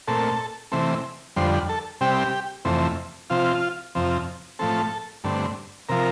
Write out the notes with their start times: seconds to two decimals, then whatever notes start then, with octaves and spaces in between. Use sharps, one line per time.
0.08 A#2 A3 C4 A4
0.72 C3 E3 A3 C4
1.36 F2 D3 G3 C5
1.69 A4
2.01 C3 G3 C4 G4
2.65 F2 C3 E3 A3 C4
3.30 C3 F3 C4 F4
3.95 F2 C3 F3 C4
4.59 A2 F3 A3 C4 A4
5.24 G2 D3 A3 C4
5.89 C3 F3 A#4